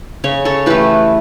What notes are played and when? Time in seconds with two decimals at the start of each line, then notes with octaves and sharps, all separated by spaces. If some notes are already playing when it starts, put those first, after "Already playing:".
0.24 C#3 C#5
0.45 A4 C#5
0.66 E3 A3 G4 B4